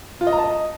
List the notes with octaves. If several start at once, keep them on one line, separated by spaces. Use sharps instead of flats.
F4
D#5
A#5
A5
D#5